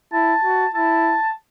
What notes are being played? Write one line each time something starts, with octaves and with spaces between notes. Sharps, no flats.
E4 A5
F#4
E4 A5